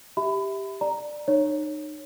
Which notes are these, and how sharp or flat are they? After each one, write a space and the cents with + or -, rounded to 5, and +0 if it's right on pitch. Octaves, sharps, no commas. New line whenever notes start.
G4 +0 E5 -15 B5 +25
D5 +15 A#5 +0
D#4 -35 C#5 -5